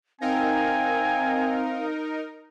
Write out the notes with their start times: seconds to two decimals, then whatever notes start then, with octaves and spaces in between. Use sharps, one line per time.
0.21 C4 D#4 A#4 F5 G#5